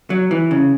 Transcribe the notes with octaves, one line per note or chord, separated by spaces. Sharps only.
F#3
E3
C#3